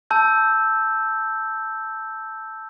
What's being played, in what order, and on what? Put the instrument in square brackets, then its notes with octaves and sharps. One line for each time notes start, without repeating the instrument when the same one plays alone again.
[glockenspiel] A5 E6 G6